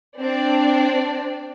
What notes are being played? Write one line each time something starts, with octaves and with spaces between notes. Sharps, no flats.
C4 D4 D5